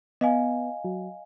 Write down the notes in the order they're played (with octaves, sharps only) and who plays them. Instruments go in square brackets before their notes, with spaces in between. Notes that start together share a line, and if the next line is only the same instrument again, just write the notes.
[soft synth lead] B3 [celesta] D#5 F5 G#5
[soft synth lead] F#3